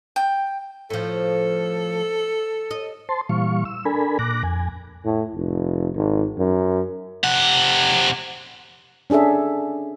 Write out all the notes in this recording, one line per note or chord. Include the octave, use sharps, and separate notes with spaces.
G5
A2 F3 A4
D#5
C5 A5 C6
A#2 E3 G3 F5 C#6
E6
D4 A4 A#4 G#5 B5
A#2 D6 F#6 A#6
F2 G#5
A2
F1
G#1
F#2
C3 F#5
C#4 D4 G#4 A4 E5